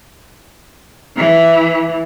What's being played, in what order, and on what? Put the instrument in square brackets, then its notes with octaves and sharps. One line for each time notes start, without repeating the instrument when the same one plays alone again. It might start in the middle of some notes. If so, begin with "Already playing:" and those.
[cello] E3